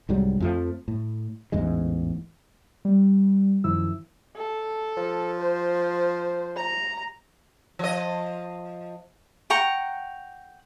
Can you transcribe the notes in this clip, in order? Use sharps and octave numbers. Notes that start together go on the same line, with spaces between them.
C2 G#2 F#3 G3
F2 F3 A3
A2
A1 E2 G#2 G#3
G3
F#2 D#3 F3 E4 E6
A4
F3
C5
A#5
F3 D#5
F#5 G5 A#5 C#6